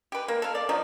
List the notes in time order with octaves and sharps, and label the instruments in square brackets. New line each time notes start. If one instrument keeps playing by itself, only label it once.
[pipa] G4 B4
A#3
A4 F5
D5
F3 F#3 D#4